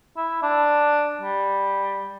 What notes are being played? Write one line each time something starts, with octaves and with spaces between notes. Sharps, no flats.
E4
D4
G3